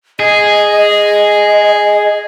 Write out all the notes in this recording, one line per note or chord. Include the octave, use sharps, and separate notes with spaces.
G#4 D#5